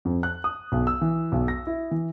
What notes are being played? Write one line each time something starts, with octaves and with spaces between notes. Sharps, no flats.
F2
F#6
D#6
B1
E6
E3
B1
A#6
E4
E3